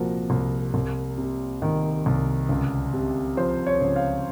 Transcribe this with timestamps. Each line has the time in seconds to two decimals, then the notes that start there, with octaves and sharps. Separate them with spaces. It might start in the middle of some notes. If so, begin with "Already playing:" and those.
Already playing: C2 A#2 F3 F#4 A#4
0.30 C2
0.74 C2
1.18 C3
1.62 D#3
2.06 C2
2.49 C#2
2.93 C3
3.37 F3 C5
3.66 C#5
3.81 C#2
3.96 F5